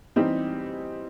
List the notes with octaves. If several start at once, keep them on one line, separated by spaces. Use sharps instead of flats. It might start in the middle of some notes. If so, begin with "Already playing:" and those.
E3 G3 C4 D#4 G4